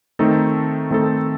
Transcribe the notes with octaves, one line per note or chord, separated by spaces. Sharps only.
D#3 A3 C4 D#4 A4
D#3 A3 C4 D#4 A4